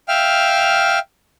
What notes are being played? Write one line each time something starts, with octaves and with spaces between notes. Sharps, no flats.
E5 F5 G5 F6